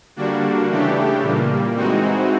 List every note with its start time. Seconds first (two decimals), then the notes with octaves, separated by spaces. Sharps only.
0.16 D3 G3 A#3 D4 F#4
0.69 C#3 E3 A3 D4 G4
1.22 A#2 G3 A#3
1.75 E3 G#3 C4 D#4 F#4